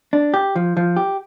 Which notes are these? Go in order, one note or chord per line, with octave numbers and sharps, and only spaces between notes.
D4
G4
F3
F3
G4